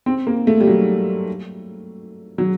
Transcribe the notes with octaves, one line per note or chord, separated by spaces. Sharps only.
C4
A#3
A3
G3
F#3
F#3